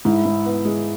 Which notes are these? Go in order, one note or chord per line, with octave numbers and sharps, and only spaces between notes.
G#2 E4
G#2
B3
G#3